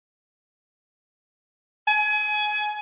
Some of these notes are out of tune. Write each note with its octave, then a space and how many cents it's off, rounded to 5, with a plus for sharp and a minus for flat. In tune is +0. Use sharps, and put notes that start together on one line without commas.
G#5 +25